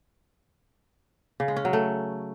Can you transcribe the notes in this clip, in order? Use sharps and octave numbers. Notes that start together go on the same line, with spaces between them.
C#3
G#3
C#4
F#3
A3